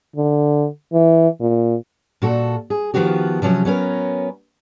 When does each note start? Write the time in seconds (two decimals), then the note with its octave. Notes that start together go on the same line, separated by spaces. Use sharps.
0.16 D3
0.93 E3
1.40 A#2
2.22 A#2 F#4 A4
2.70 G#4
2.94 D#3 F3 B3 F#4 G4
3.42 C3 F3 F#3 C#4
3.65 F#3 B3 C#4 A#4